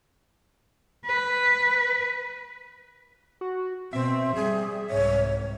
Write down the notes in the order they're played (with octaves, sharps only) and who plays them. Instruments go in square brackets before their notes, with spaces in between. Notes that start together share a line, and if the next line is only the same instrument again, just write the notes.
[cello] B4
[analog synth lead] F#4
[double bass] B2 [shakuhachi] C4 [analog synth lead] E5
[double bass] G3 [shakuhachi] G#4
[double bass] C2 G#2 [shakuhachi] C#5